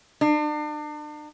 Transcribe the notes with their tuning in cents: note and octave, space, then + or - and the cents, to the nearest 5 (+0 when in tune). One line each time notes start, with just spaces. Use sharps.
D4 +40